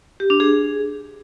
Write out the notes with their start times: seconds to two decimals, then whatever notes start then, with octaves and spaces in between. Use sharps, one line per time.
0.20 G4
0.30 D4
0.40 G#4